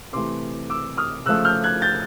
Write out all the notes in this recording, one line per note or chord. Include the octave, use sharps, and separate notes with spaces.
C3 E3 A3 C6 D6
D6 E6
D#6 F6
C#3 F3 A3 E6 F#6
F6 G6
F#6 G#6
G6 A6